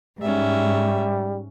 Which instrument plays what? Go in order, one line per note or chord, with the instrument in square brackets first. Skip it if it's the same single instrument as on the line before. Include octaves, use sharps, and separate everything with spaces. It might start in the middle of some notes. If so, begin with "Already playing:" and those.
[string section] G#2 [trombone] G3 [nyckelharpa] C#4 E5